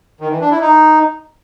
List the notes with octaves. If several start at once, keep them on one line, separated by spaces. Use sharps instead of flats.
D#3
E3
D4
E4
D#4